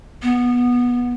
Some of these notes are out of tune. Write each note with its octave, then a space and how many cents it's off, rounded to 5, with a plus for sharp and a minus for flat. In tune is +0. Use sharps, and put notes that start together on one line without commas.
B3 -15